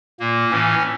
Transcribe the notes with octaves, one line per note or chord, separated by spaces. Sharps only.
A#2 A#3
A2 E3 C#4